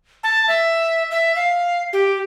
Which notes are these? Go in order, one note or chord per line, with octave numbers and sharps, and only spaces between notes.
A5
E5
E5
F5
G4